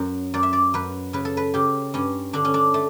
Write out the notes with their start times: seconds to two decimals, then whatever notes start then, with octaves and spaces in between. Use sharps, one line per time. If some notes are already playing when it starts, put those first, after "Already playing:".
Already playing: F#2
0.34 F#2 D5
0.43 E5
0.53 D5
0.74 F#2 B4
1.13 C#3 B4
1.25 A4
1.37 B4
1.54 C#3 G4
1.94 G2 C#4
2.33 D3 D4
2.45 C#4
2.54 D4
2.74 A3